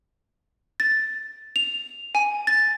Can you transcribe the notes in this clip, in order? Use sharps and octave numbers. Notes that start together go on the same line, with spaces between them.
A6
F7
G#5
A6